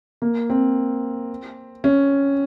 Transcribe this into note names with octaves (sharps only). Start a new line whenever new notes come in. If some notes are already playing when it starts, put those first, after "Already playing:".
A#3
C4
C#4